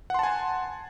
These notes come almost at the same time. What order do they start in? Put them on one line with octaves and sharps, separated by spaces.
F#5 C6 A5 G#5